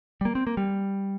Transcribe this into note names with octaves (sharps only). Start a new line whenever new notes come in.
G3
A#3
C4
A#3
G3